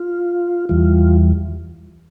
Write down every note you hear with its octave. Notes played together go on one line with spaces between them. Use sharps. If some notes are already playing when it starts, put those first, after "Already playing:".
Already playing: F4
E2 E3 G3 F4